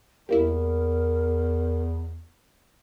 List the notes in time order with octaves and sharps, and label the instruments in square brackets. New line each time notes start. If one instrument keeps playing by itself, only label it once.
[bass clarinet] E2 [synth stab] G3 A#3 E4 [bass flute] A#4